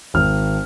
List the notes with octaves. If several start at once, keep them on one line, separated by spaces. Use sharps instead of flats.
G#1 F6